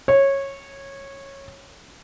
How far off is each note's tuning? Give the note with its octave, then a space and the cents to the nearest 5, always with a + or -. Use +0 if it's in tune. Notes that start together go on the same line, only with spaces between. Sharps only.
C#5 -15